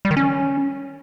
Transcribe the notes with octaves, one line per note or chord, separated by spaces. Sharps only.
G3
D#3
C#4